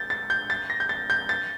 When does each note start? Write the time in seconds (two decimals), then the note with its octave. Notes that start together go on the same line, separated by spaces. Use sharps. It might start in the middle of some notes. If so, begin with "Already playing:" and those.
Already playing: G6 A6
0.10 A6
0.30 G6
0.50 A6
0.70 A#6
0.80 G6
0.89 A6
1.10 G6
1.29 A6